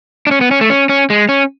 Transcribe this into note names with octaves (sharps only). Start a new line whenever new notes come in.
D4
C#4
B3
C#4
A3
C#4
C#4
G#3
C#4